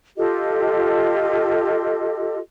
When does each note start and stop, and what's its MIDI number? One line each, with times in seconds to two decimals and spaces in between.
0.17 2.38 65
0.17 2.38 67
0.17 2.38 69
0.17 2.38 75